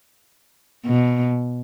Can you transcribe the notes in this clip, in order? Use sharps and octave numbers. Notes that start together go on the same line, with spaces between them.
B2